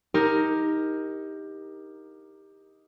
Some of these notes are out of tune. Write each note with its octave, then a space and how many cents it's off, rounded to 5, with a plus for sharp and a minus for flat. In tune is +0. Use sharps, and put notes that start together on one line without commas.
D#4 +15 G4 +15 A#4 +0